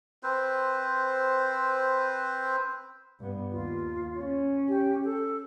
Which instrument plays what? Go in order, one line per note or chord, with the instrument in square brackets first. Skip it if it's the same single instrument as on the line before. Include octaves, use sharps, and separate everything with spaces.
[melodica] C4 B4 C5
[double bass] G2 B3
[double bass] D#2 [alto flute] F4
[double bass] C#4
[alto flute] G4
A4